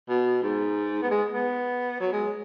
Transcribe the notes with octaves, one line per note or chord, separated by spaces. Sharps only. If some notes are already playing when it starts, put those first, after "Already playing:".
B2
G#2
B3
G#3
B3
F#3
G#3